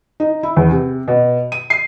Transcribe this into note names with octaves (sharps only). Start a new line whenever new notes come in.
D#4
E4
E2
C3
B2
D#7
C7